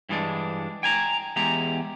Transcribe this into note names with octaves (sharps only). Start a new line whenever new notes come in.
G2 E3 G#3 D4
G5 G#5 A#5
E2 G#3 G4 A#5